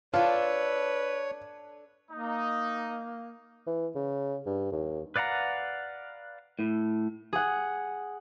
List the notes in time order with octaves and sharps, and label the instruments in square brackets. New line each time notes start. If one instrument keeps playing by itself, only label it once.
[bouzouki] D4 A4 [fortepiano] F4 [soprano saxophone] B4 [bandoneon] C#5
[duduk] A#3 [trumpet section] D#4
[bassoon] E3
C#3
G2
D#2
[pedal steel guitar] B4 D5 F5 F#5 A#5
[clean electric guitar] A2
[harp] G#4 F#5